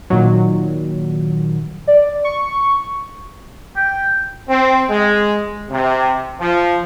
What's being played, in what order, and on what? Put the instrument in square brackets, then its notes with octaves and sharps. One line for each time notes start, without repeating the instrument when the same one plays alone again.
[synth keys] A#2 D#3 F#3
[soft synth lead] D5
C#6
[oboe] G5
[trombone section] C4
G#3
C3
F3